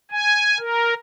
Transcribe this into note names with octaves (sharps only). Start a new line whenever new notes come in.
G#5
A#4